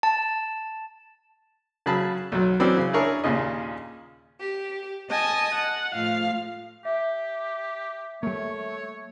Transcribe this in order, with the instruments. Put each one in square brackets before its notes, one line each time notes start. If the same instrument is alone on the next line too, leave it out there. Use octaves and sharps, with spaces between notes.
[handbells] A5
[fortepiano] C#3 F#3 G#4 A5 B5
B1 F#3
E3 F#3 C4 C#4 G4 D5
C#3
D4 E4 G#4 A#4 C#5
D#2 A#2 C#3 D#5
[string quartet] G4
D#5 G#5 A5 D#6
F#5
A2 F3 F5
[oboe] G4 [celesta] E5
[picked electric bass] G3 A#3 [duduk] A3 [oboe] C#5